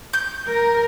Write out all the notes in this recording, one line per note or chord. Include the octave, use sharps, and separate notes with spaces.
G6
A#4